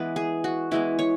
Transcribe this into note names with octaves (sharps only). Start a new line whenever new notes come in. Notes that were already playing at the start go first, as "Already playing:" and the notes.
Already playing: E3 G#3 B3 B4
G#4
F#4
E3 G#3 B3 E4
C#5